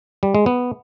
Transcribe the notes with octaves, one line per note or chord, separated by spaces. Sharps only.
G3
G#3
B3